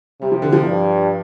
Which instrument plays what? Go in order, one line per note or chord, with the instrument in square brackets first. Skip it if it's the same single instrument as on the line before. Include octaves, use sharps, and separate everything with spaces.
[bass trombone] C3 [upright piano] G3
[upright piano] F3
D3
F3
[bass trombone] G2